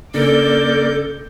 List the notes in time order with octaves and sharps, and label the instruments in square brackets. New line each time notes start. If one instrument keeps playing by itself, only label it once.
[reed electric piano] C#3 C#4 D4 [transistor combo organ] A#3 D5 [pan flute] A4 [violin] D6 G6